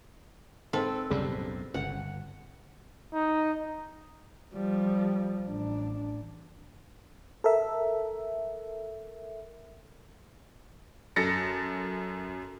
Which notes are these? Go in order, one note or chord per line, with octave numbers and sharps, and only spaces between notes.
G#2 C4 A4 B4
B1 F#2 A2 C#3 G3
G1 C#2 F#5
D#4
F3 G3
A1 D4
A4 A#4 E5
F#2 A4 A6 A#6 C#7